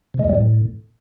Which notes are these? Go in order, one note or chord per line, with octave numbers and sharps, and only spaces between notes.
C3
G#3
E2
G3
A2